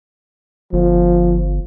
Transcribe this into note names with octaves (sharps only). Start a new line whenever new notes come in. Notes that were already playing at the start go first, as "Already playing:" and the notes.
G1 F3